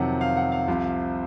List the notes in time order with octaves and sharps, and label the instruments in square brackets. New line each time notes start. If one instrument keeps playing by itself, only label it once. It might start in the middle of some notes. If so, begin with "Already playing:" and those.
Already playing: [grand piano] F2 C3 D#3 F#3 F#5
F5
F#5
F5
C2 C3 F3